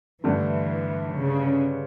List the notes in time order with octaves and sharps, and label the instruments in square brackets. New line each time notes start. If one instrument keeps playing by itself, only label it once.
[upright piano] G2 D3 A3 D4 [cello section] E3
[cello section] C#3